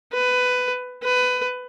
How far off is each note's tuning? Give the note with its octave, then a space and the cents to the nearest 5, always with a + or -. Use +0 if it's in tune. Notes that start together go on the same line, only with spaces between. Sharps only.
B4 +15
B4 +20